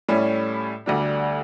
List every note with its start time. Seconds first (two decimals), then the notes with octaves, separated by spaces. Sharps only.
0.09 A2 G3 C#4 E4
0.86 D2 D3 G3 D4